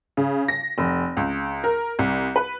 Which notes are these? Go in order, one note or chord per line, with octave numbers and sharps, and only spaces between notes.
C#3
A#6
F1
C#2
A#4
C2
B4